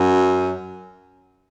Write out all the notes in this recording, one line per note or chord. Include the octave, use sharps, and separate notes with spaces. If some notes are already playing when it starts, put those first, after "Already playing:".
Already playing: F#2